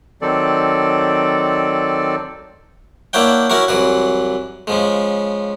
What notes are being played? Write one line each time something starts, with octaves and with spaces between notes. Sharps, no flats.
D#3 F#3 C4 A4 D5
A#3 D4 E4 C#5 F#5 G5
C#4 E4 F#4 A#4 C#6
C2 E3 F#3 F#5
C#3 F3 G#3